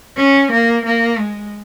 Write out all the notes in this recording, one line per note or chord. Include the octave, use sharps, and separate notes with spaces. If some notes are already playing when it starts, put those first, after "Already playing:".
C#4
A#3
A#3
G#3